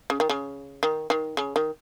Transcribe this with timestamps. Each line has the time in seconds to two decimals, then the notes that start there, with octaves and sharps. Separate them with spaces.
0.10 C#3
0.20 D#3
0.29 C#3
0.83 D#3
1.10 D#3
1.37 C#3
1.56 D#3